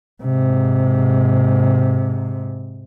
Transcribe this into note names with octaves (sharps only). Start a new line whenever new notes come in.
G#2 C3